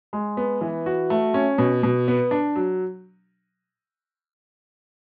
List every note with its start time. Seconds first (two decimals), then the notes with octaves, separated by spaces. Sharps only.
0.13 G#3
0.37 B3
0.61 E3
0.86 F#4
1.10 A3
1.34 C#4
1.58 B2
1.83 B2
2.08 B3
2.31 D4
2.56 F#3